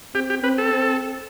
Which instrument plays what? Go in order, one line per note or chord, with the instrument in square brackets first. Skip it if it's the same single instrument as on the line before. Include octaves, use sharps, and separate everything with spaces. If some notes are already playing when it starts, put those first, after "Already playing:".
[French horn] C4 [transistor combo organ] G4
[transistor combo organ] G4
[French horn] C4 [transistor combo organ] B4
[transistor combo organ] A4
[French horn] C4